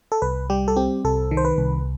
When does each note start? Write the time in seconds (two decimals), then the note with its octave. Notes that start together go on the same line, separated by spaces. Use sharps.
0.12 A4
0.22 C2 B4
0.50 G3 G4
0.68 A4
0.76 C4 G4
1.04 C2 A4
1.31 D#3
1.37 C5
1.45 B4
1.58 C2